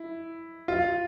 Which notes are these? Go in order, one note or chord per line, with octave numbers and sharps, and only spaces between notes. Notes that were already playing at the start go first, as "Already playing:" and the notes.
Already playing: E4
F4